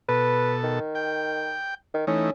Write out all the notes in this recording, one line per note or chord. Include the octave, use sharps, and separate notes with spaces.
B2 A4 B4
D#3
G5
D#3
E3 A3 C#4 D#4